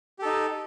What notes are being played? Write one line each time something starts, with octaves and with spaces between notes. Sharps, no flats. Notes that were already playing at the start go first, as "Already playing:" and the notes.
D#4 G4 A4